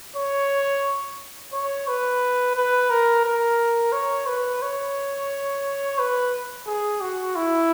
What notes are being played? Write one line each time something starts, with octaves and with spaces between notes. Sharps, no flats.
C#5
C#5
B4
B4
A#4
A#4
C#5
B4
C#5
B4
G#4
F#4
E4